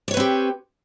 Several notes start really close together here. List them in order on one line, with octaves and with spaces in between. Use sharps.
D5 C#5 B4 C4 G4